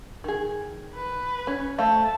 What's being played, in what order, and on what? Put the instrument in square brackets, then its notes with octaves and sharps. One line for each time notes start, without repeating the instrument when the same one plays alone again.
[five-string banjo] D#3 G#4
[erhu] B4
[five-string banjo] C#4
[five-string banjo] A3 C5 F5 [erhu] A5